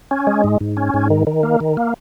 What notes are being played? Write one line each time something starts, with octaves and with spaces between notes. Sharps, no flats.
C#4
G#3
G#2
G#2
C#4
G#2
D#3
D#3
A#3
D#3
A#3